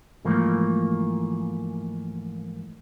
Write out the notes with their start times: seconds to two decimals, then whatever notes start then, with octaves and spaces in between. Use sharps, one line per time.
0.25 G#2 E3 F3 A3 A#3